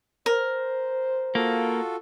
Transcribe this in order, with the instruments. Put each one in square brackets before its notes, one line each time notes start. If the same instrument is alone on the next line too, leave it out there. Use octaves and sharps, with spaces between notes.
[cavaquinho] A#4 [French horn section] C5
[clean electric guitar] A#3 [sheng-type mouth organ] F4 F#4 A4